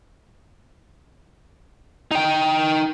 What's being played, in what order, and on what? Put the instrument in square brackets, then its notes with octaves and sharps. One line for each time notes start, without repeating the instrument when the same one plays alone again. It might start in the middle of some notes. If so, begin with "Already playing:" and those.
[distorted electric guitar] D#4 G5